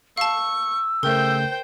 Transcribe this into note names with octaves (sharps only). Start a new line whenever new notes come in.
F5 A5 C#6 E6
C#3 A3 A#4 C5 G5